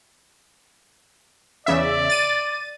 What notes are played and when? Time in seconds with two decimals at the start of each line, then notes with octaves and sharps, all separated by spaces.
1.66 E2 C#3 D5 E5
2.09 A6 D#7